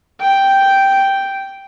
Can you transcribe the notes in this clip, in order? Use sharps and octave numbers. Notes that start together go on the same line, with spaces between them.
G5